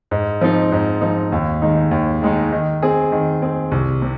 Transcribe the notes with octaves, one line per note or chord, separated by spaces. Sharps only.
G#2
F3 C4 D#4
G#2
F3 C4 D#4
D#2
D#3 G#3 D#4
D#2
D#3 G#3 D#4
D#3
C4 G#4
D#3
C4 G#4
C2
C3